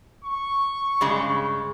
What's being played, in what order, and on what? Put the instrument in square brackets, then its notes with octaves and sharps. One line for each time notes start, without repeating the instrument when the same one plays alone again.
[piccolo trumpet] C#6
[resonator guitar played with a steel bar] G2 C#3 G#3